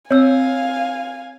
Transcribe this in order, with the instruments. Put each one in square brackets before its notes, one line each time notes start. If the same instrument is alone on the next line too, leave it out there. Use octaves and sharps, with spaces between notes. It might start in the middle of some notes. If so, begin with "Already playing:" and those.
[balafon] C4 [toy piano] C#5 E6 [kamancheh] F5 G#5